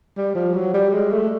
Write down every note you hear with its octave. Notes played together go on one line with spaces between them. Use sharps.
G3
F3
F#3
G3
G#3
A3